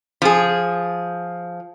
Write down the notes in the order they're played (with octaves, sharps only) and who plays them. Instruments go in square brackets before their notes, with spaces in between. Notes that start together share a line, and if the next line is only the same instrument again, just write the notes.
[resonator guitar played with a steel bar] F3 G#4